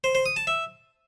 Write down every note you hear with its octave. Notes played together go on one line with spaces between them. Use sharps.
C5
C5
D#6
A5
E5